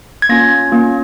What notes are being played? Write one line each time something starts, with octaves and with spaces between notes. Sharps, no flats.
G#6
A#3 C#4 F4 A#6
A#3 C#4 F4